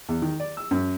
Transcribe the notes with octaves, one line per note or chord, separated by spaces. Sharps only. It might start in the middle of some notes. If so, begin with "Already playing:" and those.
E2
D#3
D5
E6
F#2